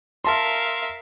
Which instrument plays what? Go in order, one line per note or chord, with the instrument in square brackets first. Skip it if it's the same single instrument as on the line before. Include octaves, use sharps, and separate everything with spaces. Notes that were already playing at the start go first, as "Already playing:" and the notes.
[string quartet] A#4 E5 F5 [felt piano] A5 C6